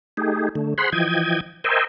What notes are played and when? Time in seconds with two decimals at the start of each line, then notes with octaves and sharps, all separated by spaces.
0.17 A3 D#4 G4 G#4
0.55 D3 A3
0.78 G#4 C5 F#5 B5 C6
0.92 E3 F3 D#5 G5 G#6
1.64 A#4 C5 D#5 E5 G5 G#5